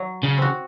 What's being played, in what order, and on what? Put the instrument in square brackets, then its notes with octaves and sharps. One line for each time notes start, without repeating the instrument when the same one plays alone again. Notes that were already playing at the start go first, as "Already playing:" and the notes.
Already playing: [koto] F#3
[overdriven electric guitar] C#3
[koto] C4 F#4